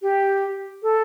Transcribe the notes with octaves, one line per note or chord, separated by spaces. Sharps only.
G4
A4